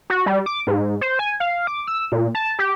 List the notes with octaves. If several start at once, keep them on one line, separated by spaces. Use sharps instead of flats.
F#4
G3
D6
G#2
C5
G#5
F5
D6
E6
A#2
A5
G4